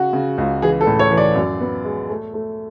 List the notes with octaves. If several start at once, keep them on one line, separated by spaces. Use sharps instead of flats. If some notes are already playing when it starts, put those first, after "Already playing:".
Already playing: C#3 F#4
C#3
C#2
E3 G#4
A4
A2
C#5
E3
D5
F#2
B3
G#3
A3
A3